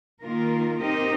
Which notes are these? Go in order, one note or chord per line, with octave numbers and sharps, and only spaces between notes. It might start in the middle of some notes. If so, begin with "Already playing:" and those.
D#3 A#3 F4 A#4
C4 D#4 G4 A#4 D#5